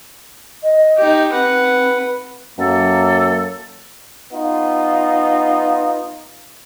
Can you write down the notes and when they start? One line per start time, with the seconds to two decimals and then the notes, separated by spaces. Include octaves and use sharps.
0.63 D#5
0.98 D#4 G4
1.33 C4 B4 F#5
2.58 F#2 F#3 A#3 A4
4.33 B3 D#4 F4